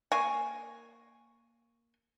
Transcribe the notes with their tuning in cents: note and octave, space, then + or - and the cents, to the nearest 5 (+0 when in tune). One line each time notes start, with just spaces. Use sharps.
A#3 +0 G#5 +0 C#6 +0